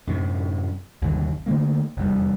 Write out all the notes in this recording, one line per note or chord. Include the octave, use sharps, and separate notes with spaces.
F#2 A2 C3
G1 D#2 C3 F#3
D3 A3 A#3
F1 E2 G3